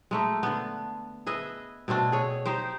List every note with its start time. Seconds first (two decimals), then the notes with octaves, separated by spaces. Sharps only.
0.11 G#3 A3 D#4
0.43 D3 B3
1.27 G#4 B4 D#5 E5
1.88 B2 A3 C4 D4
2.12 G#4 C#5
2.46 D#4 G4 C5